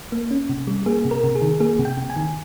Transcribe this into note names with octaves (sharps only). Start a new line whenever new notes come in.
A#3
C#4
C3
G3
A#3 G#4
C3
A#4
C3
G#4
D#3
A#3 G#4
C3
G5
C3
G#5
D#3